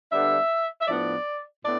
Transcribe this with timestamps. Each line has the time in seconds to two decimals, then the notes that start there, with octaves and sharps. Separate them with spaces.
0.10 D3 G3 B3 D4 E5
0.81 E5
0.87 A2 F3 B3 D4 D5
1.64 A2 B3 D4 D5